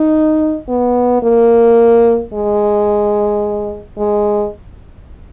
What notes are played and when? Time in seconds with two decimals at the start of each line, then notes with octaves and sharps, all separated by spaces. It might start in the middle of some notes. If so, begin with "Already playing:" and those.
Already playing: D#4
0.69 B3
1.23 A#3
2.34 G#3
3.98 G#3